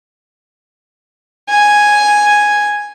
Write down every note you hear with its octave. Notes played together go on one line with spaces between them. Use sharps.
G#5